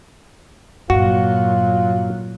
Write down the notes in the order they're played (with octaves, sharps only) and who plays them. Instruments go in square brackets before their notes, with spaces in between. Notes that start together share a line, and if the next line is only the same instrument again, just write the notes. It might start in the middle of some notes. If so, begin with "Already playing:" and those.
[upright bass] G2 [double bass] A#2 F#3 [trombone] F4 [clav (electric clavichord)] F#4